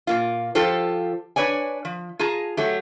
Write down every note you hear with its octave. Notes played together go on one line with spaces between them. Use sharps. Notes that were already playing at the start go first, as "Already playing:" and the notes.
A#2 A#3 F4
F3 F4 G4 A4 C5
D4 B4 C#5 D5 G#5
F3
F4 G#4 A5 A#5
F#3 A3 G4